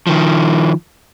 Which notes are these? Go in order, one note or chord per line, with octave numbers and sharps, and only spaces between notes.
D#3 F3